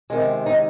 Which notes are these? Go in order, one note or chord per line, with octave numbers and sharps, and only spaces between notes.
C3 D#3 G#3
D#4